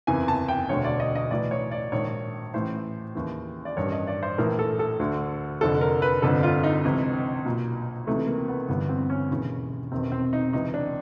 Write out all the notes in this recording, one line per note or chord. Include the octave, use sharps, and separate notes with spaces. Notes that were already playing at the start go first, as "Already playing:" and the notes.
F#1 E2 C3 E3 G#5
A5
G5
E1 D2 D3 C#5
D5
D#5
D#5
B1 A2 E3 D5
C#5
D5
A#1 G#2 D#3 C#5
A1 A2 E3 C5
D#2 C#3 E3
D5
A1 G2 D#3 C#5
D#5
D5
C5
A#1 A2 E3 A#4
A4
A4
D2 D3
F1 F2 D3 A4
A#4
B4
G1 F2 D3 A4
F4
D#4
C#2 C3 E3
B1 A#2
C#2 C3 E3 A3
A#3
B3
G1 G2 E3 B3
C4
C#4
E1 D#2 C#3 E3
E1 E2 C3 D#3 C4
C4
D#4
C#2 C3 E3 D#4
D4